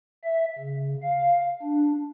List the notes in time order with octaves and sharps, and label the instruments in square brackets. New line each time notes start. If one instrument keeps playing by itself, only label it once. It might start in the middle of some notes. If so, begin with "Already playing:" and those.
[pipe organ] E5
C#3
F5
D4